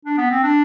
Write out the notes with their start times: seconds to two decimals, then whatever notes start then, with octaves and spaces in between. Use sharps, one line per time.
0.05 D4
0.18 B3
0.30 C4
0.43 D4